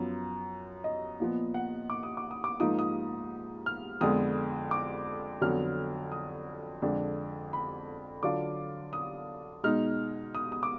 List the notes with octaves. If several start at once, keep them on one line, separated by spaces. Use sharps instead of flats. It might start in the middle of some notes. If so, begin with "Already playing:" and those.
Already playing: F#2 F3 B3
D#5
A#2 F3 B3
F#5
D6
D#6
D6
D#6
D6
G#2 F3 A#3 D#4 D#6
D#6
F6
F2 D3 G#3 B3 D#6
D6
F2 D3 F#3 B3 F6
D#6
F2 D3 G#3 D4
B5
D3 F#3 D4 F4 D6
D#6
B2 G#3 D#4 F6
D#6
D#6
D6